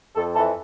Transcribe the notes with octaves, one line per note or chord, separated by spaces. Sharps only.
F2 A4
E3 A4